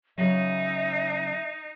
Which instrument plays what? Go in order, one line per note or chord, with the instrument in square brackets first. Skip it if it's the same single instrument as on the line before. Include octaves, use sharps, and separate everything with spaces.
[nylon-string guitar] C#3 F#3 [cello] D#4 [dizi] E5